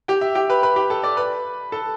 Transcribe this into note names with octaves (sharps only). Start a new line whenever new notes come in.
G4 G5
E5
G4 G5
B4 B5
B4 B5
G4 G5
A4 A5
D5 D6
B4 B5
A4 A5